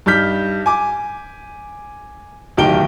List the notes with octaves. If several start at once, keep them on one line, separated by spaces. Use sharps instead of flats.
G2 G3 D#4 F6 G6 B6
G#5 D6
D1 B1 D#3 G4 D7 G7